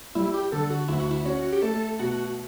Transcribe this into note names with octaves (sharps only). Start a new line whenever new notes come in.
G3 E4
G4
D3 A4
F#4
D2 E4
F#4
E4
C#4 F#4
G4
A3 A4
B2 F#4